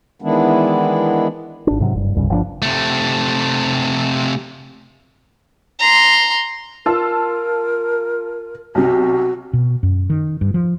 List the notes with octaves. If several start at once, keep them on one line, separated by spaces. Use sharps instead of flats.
D#3 E3 G#3 B3 D4 E4
G#1 D4
G#2 C3 F#3
F#1 G2
D#1 C2 G2 C#3
G1 F3 C4 D4
C3 A3
A#5 C6
F4 A#4 A5 E6
B1 C3 F#4
B2
F#2
D#3
G2
F3